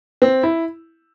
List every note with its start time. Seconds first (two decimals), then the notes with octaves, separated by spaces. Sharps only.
0.22 C4
0.43 E4